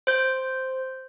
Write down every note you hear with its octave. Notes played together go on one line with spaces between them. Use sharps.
C5 G6